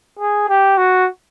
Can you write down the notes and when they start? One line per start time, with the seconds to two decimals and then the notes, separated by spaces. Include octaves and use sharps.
0.19 G#4
0.49 G4
0.77 F#4